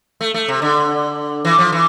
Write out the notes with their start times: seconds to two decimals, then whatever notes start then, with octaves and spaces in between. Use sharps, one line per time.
0.21 A3
0.34 A3
0.48 C3
0.62 D3
1.45 E3
1.58 F3
1.72 E3